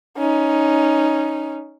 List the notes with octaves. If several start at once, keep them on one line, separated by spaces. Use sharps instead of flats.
C#4 D#4